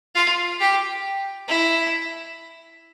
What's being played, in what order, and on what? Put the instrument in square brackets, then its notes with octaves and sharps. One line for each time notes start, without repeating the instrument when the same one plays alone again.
[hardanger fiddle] F4
G4
E4